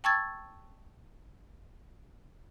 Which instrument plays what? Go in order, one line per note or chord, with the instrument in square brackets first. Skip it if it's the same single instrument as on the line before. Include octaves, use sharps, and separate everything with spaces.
[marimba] G5 A5 C#6 E6 G#6 A6